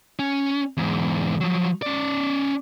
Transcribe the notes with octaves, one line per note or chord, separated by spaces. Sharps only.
C#4
E2 G#2
F3 F#3
C#4 D5